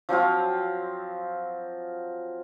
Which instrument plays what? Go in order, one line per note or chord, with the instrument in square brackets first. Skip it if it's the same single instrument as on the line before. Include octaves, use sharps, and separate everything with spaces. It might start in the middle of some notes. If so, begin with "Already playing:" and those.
[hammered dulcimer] F3 F#3 C4 F4